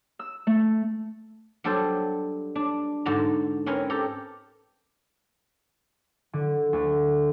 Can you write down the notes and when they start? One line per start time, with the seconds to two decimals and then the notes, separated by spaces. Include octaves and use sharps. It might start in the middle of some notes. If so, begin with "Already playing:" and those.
0.19 E6
0.47 A3
1.64 F#3 G3 D4 A4 C5
2.55 D4
3.05 G#2 D3 F#4 A5 A#5
3.66 C4 C#4 A#4 B4 G#5
3.90 G4 A4 A#5
6.33 D3
6.73 D2